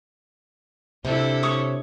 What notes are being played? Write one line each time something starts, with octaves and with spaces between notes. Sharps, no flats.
C3 D4 E4 A4
C#5 C#6 D#6